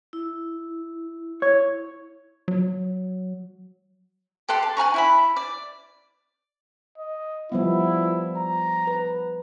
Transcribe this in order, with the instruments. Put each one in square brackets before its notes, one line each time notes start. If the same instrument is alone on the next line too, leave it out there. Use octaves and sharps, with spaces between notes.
[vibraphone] E4
[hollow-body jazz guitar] C#5
[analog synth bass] F#3
[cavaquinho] G4 A4 F#5 C6
A5
F#5 G#5 A#5 C#6
E4 E5 B5
D5
[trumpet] D#5
[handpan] F3 G3 B3 [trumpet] E4
[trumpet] A#5
[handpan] B4